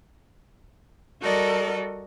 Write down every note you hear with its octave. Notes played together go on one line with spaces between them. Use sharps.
G3 F#4 A4 A#4 D5 D#5